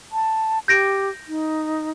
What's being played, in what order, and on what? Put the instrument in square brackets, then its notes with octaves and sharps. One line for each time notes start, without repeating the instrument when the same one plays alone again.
[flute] A5
[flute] G4 [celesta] G6 A#6 D7
[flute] D#4